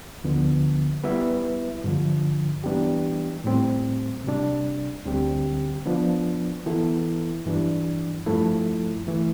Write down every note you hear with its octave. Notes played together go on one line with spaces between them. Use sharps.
D2 D3 F3 B3
G3 B3 E4 B4 E5
G2 D3 F3
E3 G3 B3 D4 G4
A2 G3 C4
C3 G3 D4
D2 D3 G3 C4 G4
F3 B3 D4
E3 B3 E4 A4
G2 E3 G3 D4
G2 F3 A3 E4 A4
E3 A3